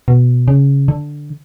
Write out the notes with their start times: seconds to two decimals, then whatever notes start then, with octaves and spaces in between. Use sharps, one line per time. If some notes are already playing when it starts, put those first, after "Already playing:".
0.08 B2
0.48 C#3
0.88 D3